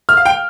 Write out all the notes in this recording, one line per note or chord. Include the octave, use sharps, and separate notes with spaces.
F6
F5
G5